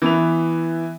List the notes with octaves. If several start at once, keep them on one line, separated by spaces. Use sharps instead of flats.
E3 B3 E5 F7